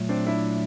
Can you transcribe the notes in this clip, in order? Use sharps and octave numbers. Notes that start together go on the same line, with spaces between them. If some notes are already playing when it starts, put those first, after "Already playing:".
Already playing: A#2 F#3 A3
C4 D4
D4 E4